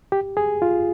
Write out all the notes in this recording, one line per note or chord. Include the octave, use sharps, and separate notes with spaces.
G4
G#4
F4